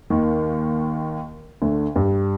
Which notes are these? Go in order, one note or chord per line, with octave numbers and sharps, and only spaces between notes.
D#2 D#3
D2 D3
G2 G3